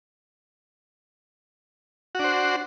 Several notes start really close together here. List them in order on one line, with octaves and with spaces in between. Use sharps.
F#4 D4 C5